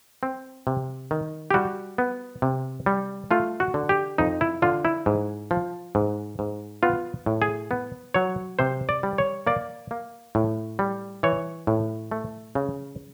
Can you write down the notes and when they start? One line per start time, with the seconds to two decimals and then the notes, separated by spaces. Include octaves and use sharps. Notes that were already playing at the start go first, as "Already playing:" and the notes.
0.23 C4
0.67 C3
1.11 D#3
1.51 G4
1.54 G3 F#4
1.98 B3
2.42 C3
2.86 G3
3.31 A3 F4
3.60 F#4
3.74 D3
3.89 G4
4.18 F2 D#4
4.41 E4
4.62 D3 F4
4.85 E4
5.06 G#2
5.51 F3
5.95 G#2
6.39 G#2
6.83 B3 F4
7.26 A2
7.42 G#4
7.71 B3
8.14 F#3 C#5
8.59 C3 C5
8.89 D5
9.03 G3
9.18 C#5
9.47 A#3 D5
9.91 A#3
10.35 A2
10.79 G3
11.23 E3 C#5
11.67 A2
12.11 A3
12.55 C#3